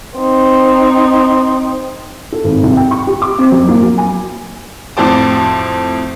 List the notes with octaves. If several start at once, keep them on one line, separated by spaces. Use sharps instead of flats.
C4 D#4
A4
G#1
C2
G5
C#6
G4
D6
C4
F#2
A#3
F#3
G#5
F2 A2 F#4 C5 A5 D6